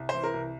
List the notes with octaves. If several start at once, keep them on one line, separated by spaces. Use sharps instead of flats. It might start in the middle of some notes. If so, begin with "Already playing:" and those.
Already playing: C2
E3 C5
A#4
C2